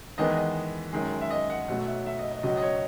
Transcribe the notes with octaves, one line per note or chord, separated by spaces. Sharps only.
E2 D#3 G#3 B3 D#5
D#5
F#2 D#3 G#3
E5
D#5
F#5
B1 B2 F#3 A3 F#5
E5
E5
D#5
D#5
C#2 B2 F#3 D#5
D#5
C#5